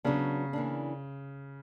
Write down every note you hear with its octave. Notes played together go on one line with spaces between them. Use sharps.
C#3 F#3 B3 D4
E3 A#3 D4